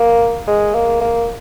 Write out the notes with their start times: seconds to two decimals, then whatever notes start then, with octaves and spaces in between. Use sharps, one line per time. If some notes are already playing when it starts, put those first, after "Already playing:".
Already playing: A#3
0.47 G#3
0.75 A#3
1.01 A#3